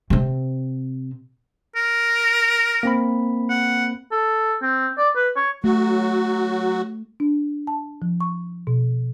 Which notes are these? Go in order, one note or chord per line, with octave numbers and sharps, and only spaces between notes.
C3 C4
A#4
A#3 C4 B5
F#5
A4
C4
D5
B4
C#5
F#3 A3 F#4
D4
A5
F3
C#6
B2